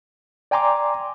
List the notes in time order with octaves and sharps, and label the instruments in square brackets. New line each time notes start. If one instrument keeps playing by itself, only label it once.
[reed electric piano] D5 G5 G#5 A#5 C6 D6